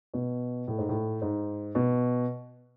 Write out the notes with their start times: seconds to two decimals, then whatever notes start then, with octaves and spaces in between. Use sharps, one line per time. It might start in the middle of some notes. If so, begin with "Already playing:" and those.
0.14 B2
0.68 A2
0.78 G#2
0.89 A2
1.22 G#2
1.75 B2